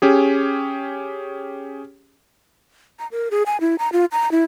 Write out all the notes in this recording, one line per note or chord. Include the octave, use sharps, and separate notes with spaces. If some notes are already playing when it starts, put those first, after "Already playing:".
C#4 G4 G#4
A#5
A#4
G#4
G#5
E4
A#5
F4
A#5
E4